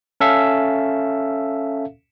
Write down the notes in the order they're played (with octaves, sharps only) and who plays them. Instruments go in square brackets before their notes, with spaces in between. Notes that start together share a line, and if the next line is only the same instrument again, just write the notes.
[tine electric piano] C#4 A4 E5 F5